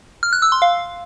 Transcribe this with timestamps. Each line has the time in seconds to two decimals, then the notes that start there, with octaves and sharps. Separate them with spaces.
0.23 F6
0.33 F#6
0.42 E6
0.52 C6
0.62 F5